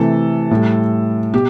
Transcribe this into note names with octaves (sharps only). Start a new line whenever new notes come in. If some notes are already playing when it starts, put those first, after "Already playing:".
Already playing: C3 E3 A3 A4
A2 G3
B2 G4